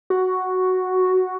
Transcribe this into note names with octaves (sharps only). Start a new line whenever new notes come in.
F#4